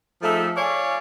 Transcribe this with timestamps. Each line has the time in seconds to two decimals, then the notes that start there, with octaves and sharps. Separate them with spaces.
0.22 F3 A3 D#4 G#4 A4 E5
0.56 C#5 D5 F5 G#5